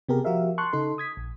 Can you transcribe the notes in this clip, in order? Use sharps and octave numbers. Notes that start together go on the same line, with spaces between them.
C3 B3 G4 G#4 A#4
F3 F#4 G4 A#4 E5 F5
A5 C6 C#6 F#6
C#3 D#4 A4 C6
D#6 G#6 B6
A#1